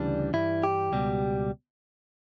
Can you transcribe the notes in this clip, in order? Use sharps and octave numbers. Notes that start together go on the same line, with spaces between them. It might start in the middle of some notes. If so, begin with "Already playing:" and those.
Already playing: D2 C#3 E3 G3 D4
G2 E3 G3 E4
G4
C#2 B2 G3